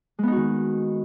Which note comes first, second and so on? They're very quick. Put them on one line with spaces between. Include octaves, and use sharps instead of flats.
G#3 B3 D#4 F#4 D#3